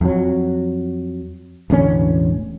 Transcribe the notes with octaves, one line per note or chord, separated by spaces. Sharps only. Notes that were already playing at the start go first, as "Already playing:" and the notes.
F2 F#3
E1 A1 D3 C#4